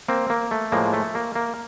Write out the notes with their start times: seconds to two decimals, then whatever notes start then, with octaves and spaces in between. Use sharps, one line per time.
0.08 A#3 C4
0.30 A#3
0.51 A3
0.72 A2 F3 G#3 A#3
0.93 A3
1.15 A#3
1.36 A#3